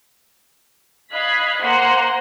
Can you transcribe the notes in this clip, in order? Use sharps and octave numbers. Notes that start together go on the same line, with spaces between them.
D#5 F5 B5 F#6 G#6 B6
A#3 C5 F#5 A#5 C6